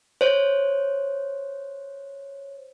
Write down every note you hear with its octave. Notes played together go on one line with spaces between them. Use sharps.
C5 C#5